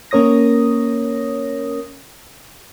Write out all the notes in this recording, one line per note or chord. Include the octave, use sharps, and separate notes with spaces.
A#3 C#4 A#4 C#5 D#6 A#6